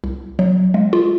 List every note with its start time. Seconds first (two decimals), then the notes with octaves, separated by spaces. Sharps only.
0.04 C2
0.39 F#3
0.74 G#3
0.93 F4